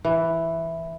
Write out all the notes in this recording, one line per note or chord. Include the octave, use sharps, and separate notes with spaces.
E3